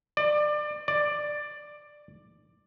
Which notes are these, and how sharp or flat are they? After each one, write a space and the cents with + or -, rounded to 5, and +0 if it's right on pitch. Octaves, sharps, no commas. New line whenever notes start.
D5 +25
D5 +10